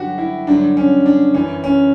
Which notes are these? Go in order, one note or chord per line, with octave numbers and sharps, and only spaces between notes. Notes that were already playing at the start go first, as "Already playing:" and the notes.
Already playing: G2 D3 F#3 F#4 G4
E4
G2 D3 F#3 D4
C#4
D4
F#2 E3 C#4
C#4